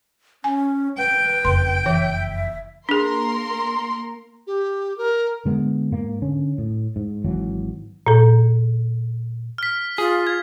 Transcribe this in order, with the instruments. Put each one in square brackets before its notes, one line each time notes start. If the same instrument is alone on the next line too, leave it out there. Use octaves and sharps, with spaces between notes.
[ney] C#4 [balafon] G#5
[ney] B4 [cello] G5
[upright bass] F#1 F2 [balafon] C6
[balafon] E3 C#5 [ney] E5
[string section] A#3 A#4 C6 [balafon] D4 G#4
[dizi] G4
A#4
[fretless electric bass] D3 G#3 B3
G#2 A#3
D3 C#4
A2
G#2
G#1 E3 F#3
[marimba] A#2 A4
[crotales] F6 B6
[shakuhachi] F4 [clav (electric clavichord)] G#4
[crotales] G#6